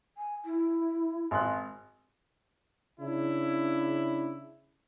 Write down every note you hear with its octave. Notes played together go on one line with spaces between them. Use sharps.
G#5
E4
G#1 C6 F#6
C#3 D4 E4